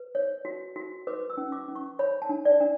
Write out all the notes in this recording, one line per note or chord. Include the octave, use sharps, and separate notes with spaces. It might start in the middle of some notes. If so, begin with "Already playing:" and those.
Already playing: B4
C#5
F#4
F#4
B4 D6
E6
C#4
D6
C#4
C#6
C#5 B5
A5
D4
D5
D4